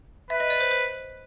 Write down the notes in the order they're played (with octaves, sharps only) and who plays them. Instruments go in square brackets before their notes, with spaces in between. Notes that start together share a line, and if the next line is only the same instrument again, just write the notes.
[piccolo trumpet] B4 [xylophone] E5
[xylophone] D#5
D5
C5
C5